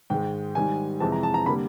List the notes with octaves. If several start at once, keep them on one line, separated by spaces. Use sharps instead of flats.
G#2 D#3 G#3 G5
G#2 D#3 G3 G#5
F2 C3 E3 G#3 C4 A5
A#5
A5
A#5
D3 G3 A#3 B5